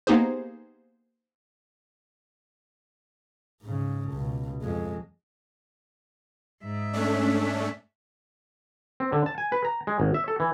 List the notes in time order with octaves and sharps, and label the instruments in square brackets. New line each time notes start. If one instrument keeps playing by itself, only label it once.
[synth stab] A#3 B3 D#4 G4 G#4 C5
[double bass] G#2 C#3
C#2 B2
F2 G#3
[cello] G#2 E5
[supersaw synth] A3 C#4 D4
[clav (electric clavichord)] C4
D3
A5
G#5
B4
A#5
G#3
G#1
E5
A4
E3